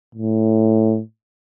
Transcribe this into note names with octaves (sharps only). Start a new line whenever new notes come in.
A2